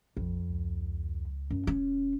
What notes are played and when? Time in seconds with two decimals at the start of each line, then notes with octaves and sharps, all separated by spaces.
0.17 A#1 F2
0.50 C#2
1.51 F#2
1.67 E1 C#4